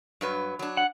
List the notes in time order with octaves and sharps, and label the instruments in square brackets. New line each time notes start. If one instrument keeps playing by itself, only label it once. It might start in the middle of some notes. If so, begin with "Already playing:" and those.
[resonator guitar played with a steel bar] G2 F#3 B4
F#3 D4
[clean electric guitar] F#5